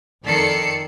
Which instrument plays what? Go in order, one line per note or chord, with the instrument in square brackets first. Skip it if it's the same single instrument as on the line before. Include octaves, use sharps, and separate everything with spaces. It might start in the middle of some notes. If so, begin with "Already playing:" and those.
[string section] F2 D#3 A4 D5 C7 C#7